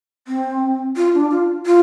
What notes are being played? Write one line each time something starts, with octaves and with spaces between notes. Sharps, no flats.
C4
F4
D4
F4
F4